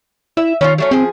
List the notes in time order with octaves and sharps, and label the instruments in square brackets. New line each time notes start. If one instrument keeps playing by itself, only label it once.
[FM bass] E4 [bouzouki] E5
[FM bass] D#3 [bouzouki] C#4 E4 F4
[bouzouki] F#3 A3 C#4
[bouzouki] F3 G#4 [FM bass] C4